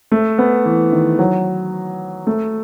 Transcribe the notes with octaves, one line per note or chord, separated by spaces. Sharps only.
A3
B3
E3
D#3
F#3
A3